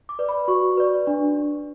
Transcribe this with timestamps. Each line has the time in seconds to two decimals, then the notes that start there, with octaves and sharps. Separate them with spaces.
0.09 D6
0.19 B4 D5
0.29 B5
0.48 F#4 C#6
0.77 B4 D5
1.07 D4